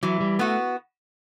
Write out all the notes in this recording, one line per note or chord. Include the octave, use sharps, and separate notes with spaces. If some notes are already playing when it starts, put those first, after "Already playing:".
E3 F#3
G3
A3 B3 F#4